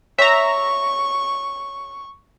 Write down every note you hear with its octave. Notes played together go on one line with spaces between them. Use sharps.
C#5 E5 A#5 C#6